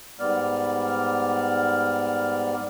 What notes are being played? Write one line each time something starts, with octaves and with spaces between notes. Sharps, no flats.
G#2 G3 B3 D5 F6